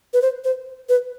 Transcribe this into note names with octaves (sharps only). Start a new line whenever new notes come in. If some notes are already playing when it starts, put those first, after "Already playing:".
B4
C5
C5
B4